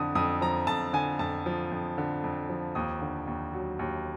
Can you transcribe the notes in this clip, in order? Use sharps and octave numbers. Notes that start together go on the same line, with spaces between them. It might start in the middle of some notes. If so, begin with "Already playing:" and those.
Already playing: F2 D3 D#6
F2 D#6
F3 A#5
F2 A5
D3 G#5
F2 A5
F3
F2
D3
F2
F3
D#2 D#6
D3
D#2
F#3
D#2